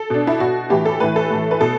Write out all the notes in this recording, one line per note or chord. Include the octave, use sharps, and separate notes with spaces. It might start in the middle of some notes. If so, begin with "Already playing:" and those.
Already playing: A4
B2 D4
E4
B2 F#4
A2 E3 G4
A4
A2 E3 B4
A4
A2 E3
B4
B2 A4